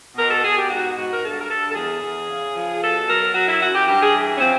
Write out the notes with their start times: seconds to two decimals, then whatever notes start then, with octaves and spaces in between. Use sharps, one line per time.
0.17 B2 A#4
0.31 A4
0.44 B2 G#4
0.57 G4
0.69 G#2 F#4
0.96 G#2 F#4
1.12 A#4
1.23 G2 A4
1.40 A#4
1.49 G2 A4
1.70 A4
1.75 E2 G#4
2.03 E2
2.28 C#3
2.55 F3
2.81 B2 A4
3.08 F#3 A#4
3.34 F#3 F#4
3.47 E4
3.61 F#2 F#4
3.74 G4
3.88 G2 G4
4.01 G#4
4.15 E3
4.36 C#4
4.41 F3 C4